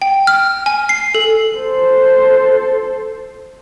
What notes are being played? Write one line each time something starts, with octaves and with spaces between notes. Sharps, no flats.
G5
F6
G#5
C7
A4
A4 C5